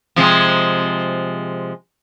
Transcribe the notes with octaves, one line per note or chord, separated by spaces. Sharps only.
C3 F3 G#3